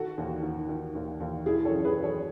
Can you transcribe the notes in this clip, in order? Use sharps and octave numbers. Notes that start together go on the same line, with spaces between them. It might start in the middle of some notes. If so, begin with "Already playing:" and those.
Already playing: D#3 F#4 A4
D#2
D#3
D#3
D#2
D#2
D#3 E4 G#4
A4 C#5
F#2
G#4 B4
F#2
A4 C#5